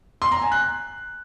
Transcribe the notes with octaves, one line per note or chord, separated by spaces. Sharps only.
C6
A#5
G#5
F#6